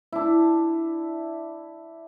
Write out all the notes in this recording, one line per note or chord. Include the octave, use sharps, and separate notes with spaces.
D4 E4